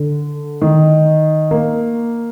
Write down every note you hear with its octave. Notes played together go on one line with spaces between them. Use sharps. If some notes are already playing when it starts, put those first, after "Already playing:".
Already playing: D3
D#3
A#3